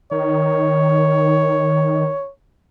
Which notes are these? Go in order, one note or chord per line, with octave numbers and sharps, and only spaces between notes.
D#3 C#5